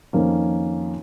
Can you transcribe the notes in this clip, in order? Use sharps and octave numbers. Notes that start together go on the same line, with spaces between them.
F2 D#3 A#3 C#4